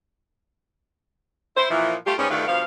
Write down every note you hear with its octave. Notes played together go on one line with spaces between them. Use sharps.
E4 C5
A#2 E3 F3
A3 F4 G4
G#2 G3 B3 C#4
D2 G2 D3 D#3 A3 F4
G2 B2 F3 F5